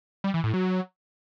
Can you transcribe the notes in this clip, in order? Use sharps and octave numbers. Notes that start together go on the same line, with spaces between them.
G3
E3
A2
F#3